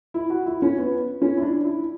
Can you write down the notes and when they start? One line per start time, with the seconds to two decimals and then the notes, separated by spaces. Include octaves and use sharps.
0.14 E4
0.30 F#4
0.46 E4
0.62 C#4
0.78 B3
1.22 C#4
1.37 E4
1.42 D4
1.64 E4